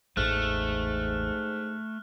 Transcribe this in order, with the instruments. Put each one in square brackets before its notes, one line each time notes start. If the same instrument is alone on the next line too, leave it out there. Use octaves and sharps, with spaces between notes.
[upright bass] A1 E2 [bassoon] G#2 [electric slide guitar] A3 [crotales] F6 F#6